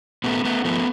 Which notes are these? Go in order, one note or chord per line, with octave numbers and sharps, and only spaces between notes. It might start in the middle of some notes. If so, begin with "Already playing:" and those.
A#2 A3 B3
A3 B3
F3 A3 B3